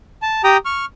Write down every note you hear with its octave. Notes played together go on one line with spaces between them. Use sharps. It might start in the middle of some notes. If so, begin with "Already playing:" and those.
A5
G4 G5 A#5 D#6
C#6 F6